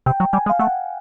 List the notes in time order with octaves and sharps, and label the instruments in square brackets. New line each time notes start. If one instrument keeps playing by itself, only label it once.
[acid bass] C3 [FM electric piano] G5
[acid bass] F#3
[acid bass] G3 [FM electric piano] G#5
[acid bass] G#3
[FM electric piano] F5
[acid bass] A3 [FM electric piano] F#5